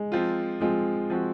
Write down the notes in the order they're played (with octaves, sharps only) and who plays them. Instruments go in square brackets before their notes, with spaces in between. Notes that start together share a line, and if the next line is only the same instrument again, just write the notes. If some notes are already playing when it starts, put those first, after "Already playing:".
Already playing: [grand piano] G#3
[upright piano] F3 C4 F4
[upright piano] F3 C4 F4 [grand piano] G#3
[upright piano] F3 C4 F#4